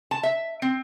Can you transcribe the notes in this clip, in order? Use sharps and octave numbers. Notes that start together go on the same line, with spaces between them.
A5
E5
C4